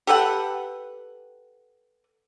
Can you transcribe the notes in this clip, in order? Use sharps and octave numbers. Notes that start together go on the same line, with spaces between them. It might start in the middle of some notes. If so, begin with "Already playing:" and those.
G4 A4 B4 F#5